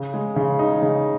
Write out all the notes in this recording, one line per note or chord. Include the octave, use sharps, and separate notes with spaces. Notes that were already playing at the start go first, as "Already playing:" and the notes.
Already playing: C#3
G#3
C#3
D#4
C#3